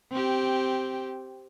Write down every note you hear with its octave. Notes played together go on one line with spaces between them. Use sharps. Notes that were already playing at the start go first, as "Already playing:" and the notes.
C4 G4